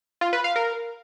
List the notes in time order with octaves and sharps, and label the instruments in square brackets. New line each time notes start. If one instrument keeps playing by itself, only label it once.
[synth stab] F4
B4
F5
A#4